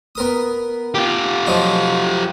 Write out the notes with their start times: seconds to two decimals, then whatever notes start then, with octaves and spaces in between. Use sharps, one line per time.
0.15 B3 A#4 D#6
0.95 F4 G4
1.46 F3 F#3 D#4